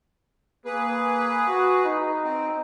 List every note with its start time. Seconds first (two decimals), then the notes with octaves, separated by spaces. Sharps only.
0.65 A#3 G#4 B4
1.47 F#4
1.85 D#4
2.23 C4